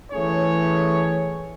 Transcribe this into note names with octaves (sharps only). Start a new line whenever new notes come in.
E3 A3 C#4 G#4 C#5